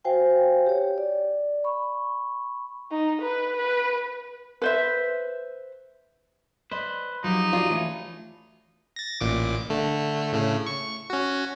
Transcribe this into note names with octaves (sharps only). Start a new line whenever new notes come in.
F#4 C5 F5 G5 G#5
G4 C#5
D5
B5 C#6
D#4
B4
B4
B4 C5 E5
B4 C5 D5 D#5
F3 F#3 D#4 G4
F4 F#4 A4 D5
E3 A3 C#4
A6 A#6
A1 A#2 D6
D3 A3
A2 C#3 A3
C#6
C#4 F#4